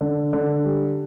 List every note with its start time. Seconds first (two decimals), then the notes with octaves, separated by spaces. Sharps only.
0.01 D3
0.33 D3
0.65 G3